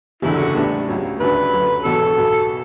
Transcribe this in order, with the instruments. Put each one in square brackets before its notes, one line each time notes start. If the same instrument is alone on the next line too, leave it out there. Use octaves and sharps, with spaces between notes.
[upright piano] F#1 E2 D3 [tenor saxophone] E4
[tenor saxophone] F#4
[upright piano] A2 G3 B3 D4
C#2 C#3 F#3 C#4
[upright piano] D2 C#3 G3 D4 F#4 [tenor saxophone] B4
[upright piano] F#2 D3 F#3
[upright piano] E1 E2 B2 F#3 B3 [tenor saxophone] A4
[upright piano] B1 B2 F#3 B3